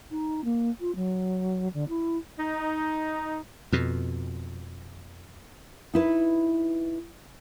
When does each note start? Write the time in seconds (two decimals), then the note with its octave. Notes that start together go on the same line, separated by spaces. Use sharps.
0.11 D#4
0.45 A#3
0.80 F4
0.95 F#3
1.74 D3
1.89 E4
2.38 D#4
3.72 F2 B2
5.94 D#4 E4 B4